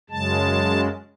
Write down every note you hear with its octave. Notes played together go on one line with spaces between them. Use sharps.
F#2 C#3 G#3 A5